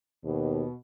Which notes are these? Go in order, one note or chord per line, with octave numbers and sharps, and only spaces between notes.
D#2 B2